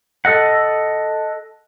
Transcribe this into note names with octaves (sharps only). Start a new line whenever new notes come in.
A4 D#5 F#5